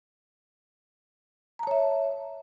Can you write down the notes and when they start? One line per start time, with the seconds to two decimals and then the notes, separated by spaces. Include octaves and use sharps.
1.59 A#5
1.63 A5
1.67 C#5
1.71 E5